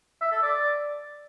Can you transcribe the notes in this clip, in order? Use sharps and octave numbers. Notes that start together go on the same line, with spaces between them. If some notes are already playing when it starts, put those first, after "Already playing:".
E5
A4
D5